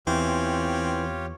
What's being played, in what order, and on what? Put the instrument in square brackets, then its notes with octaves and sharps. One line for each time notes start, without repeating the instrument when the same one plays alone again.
[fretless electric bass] E2 [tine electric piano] E3 [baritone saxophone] C4 [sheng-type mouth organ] F4 G4 C#5